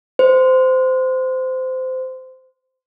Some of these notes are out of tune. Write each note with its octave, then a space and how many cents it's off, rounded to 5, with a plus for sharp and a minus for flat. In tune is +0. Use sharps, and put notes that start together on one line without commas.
C5 -20